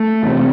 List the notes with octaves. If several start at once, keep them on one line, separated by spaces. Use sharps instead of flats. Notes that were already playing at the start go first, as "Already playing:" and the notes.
Already playing: A3
E2 C3